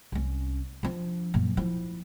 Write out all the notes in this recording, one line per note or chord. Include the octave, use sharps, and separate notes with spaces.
C2 C#4
F3 D4
F#2 A#2
F3 E4